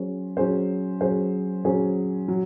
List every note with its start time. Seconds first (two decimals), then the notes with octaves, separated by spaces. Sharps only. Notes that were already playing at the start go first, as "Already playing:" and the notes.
Already playing: F#3 C#4 G#4 C5
0.37 F#3 C#4 G#4 C5
1.00 F#3 C#4 G#4 C5
1.65 F#3 C#4 G#4 C5
2.28 F#3